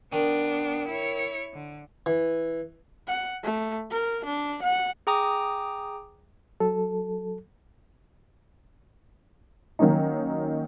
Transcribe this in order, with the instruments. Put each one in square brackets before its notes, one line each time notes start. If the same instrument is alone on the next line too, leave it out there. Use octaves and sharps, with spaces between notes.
[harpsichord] D#3 [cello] B3 D4
[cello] E4 C#5
D3
[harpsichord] E3
[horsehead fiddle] F#5
A3
A#4
D4
F#5
[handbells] G#4 G5 A#5 D6 D#6
[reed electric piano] F#3 A4
[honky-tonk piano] D#3 F#3 A#3 C#4 D#4